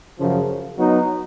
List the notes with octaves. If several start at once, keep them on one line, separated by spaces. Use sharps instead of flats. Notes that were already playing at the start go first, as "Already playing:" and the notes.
F#2 C#3 F3
F#3 B3 D#4 F#4